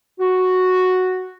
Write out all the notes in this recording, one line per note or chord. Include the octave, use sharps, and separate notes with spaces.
F#4